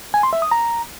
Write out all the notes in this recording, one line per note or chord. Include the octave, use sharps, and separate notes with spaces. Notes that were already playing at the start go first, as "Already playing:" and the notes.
G#5
C6
E5
D#6
A#5